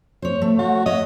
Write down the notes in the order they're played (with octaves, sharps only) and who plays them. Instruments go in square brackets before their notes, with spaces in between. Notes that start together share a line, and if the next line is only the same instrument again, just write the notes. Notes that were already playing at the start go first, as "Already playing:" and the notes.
[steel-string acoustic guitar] C5 C#5
A3
[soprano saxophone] F#4
[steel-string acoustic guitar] C#5 E5 [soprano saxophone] D#5